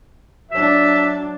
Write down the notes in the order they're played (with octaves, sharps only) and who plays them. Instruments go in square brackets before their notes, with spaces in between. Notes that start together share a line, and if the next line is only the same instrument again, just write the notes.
[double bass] F#3 D4 [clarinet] E5